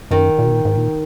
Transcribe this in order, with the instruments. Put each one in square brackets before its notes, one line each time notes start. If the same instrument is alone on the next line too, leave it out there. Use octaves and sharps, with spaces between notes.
[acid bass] F#2 [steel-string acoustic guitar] D#3
[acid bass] A#2
B2
A#2
G#2
A#2